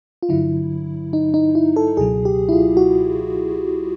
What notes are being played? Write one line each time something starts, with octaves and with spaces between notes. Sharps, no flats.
F4
G2 D3 F#3 E4
D#4
D#4
E4
A4
C#2 B2 F#3 G#4
G4
E4
F4
F#4